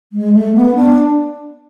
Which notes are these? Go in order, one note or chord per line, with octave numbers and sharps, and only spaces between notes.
G#3
A3
B3
D4